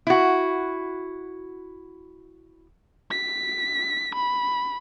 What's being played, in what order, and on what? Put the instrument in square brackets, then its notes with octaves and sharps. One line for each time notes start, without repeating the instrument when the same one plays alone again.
[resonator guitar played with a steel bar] E4 F#4
[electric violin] B6
B5